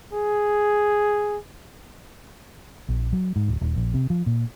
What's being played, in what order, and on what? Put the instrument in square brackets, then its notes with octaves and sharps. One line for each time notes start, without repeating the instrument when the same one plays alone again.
[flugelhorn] G#4
[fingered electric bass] A#1
F#3
G#2
D1
D#1
A#1
C3
F3
A#2